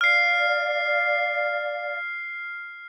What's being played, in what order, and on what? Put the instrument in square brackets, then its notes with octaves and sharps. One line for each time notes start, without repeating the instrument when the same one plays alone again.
[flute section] D5 F5 [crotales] F6 C7